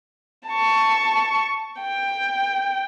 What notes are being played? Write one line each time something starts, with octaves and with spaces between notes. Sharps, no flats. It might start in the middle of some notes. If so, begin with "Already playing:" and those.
A5 C#6
G5